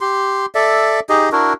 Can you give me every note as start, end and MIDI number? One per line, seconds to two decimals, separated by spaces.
0.01 0.46 67
0.01 0.46 84
0.55 1.00 69
0.55 1.00 74
0.55 1.00 76
1.09 1.29 63
1.09 1.29 67
1.09 1.29 68
1.09 1.29 75
1.32 1.53 62
1.32 1.53 64
1.32 1.53 66
1.32 1.53 70